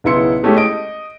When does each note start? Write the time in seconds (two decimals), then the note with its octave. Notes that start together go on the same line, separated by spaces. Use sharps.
0.04 B1 C#3 B3 E4 C6 C#7
0.43 G#3 A3 C#4 E4 G4 A4
0.57 D#5 D7